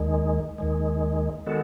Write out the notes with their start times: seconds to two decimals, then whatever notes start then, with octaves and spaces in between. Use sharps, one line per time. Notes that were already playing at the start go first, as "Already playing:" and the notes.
Already playing: D#2 D#3 G#3
0.58 D#2 D#3 G#3
1.46 D#3 G#3 B3 F#4 A4